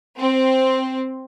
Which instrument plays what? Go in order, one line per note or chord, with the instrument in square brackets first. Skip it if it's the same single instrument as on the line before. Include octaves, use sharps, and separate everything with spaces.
[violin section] C4